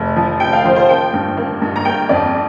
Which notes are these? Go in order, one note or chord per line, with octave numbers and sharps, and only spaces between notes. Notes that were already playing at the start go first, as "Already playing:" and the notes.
Already playing: F1
F3
F1 G5
F5
F3 C5
C5
A#3 G5
G2
A#3
G2
A#5
A#3 G5
F2 D5